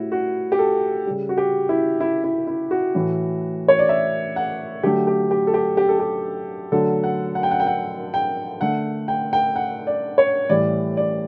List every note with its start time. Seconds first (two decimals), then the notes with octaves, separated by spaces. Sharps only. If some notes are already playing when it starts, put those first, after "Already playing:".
Already playing: A2 G3 E4 F#4
0.12 F#4
0.52 G4
0.59 A4
1.06 C#3 G3
1.29 F#4
1.38 G4
1.69 E4
2.01 E4
2.24 E4
2.47 E4
2.71 F#4
2.95 A2 E3 A3
3.68 C#5
3.79 D5
3.89 E5
4.36 F#5
4.83 D3 F#3 A3 G4
5.07 G4
5.31 G4
5.47 A4
5.54 G4
5.77 G4
5.89 A4
6.00 G4
6.72 D3 F#3 A3 A4
7.04 F#5
7.35 F#5
7.43 G5
7.51 F#5
7.60 G5
7.67 F#5
8.14 G5
8.61 D3 A3 F#5
9.08 G5
9.33 G5
9.56 F#5
9.87 D5
10.18 C#5
10.49 A2 E3 G3 D5
10.97 D5